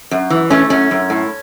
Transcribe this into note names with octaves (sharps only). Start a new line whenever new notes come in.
F#2
E3
A3 C#4
F#2 C#4
F#2
A2